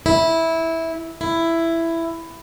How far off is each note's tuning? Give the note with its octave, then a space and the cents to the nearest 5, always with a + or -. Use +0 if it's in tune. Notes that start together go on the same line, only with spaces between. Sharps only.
E4 -10
E4 +10